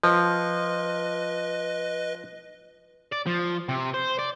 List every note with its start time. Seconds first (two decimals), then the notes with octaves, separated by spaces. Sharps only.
0.03 F3 B4 D#5
3.12 D5
3.26 F3
3.69 C3
3.94 C5
4.19 D5